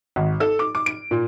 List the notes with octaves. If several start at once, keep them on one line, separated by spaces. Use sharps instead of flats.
G#1
A4
D6
D6
D7
A#2